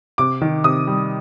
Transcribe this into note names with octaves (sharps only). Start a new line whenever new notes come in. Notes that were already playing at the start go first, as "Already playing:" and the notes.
C3 D6
D#3
C3 D#6
G3